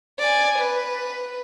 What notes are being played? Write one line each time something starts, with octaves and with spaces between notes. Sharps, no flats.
D5 G#5
B4